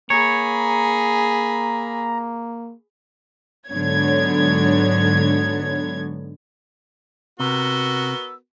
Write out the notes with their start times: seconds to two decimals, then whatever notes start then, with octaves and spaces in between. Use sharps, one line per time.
0.10 A#3 G#4 C#5 A#5 B5
3.70 G#2 D3 F#3 B3 C#5 G#6
7.40 C3 B3 F#4 A#4 E6 G7